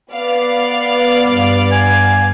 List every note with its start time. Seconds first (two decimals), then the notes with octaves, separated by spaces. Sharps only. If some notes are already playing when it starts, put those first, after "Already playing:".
0.12 B3 D5 F5
1.26 G2
1.72 G#5